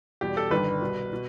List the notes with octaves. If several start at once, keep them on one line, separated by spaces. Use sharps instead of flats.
E2 B2 G3 G4
A4
G1 G2 D#3 G3 B4
C2 B2 G3
B2